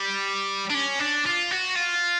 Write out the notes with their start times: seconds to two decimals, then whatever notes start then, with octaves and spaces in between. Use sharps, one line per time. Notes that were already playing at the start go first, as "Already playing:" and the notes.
Already playing: G3
0.70 D4
0.74 C#4
0.99 D4
1.26 F4
1.51 F#4
1.76 F4